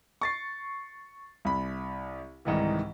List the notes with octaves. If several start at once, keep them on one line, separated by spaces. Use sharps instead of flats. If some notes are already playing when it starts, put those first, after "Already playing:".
C#6 A6 C7
C2 B5
C2 G#2 D#3 E3